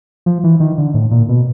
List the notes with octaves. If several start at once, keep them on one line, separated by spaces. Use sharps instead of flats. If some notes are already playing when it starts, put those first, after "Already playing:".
F3
E3
D#3
D3
A2
A#2
B2